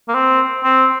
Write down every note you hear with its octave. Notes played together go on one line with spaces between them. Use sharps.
A#3
C4
C4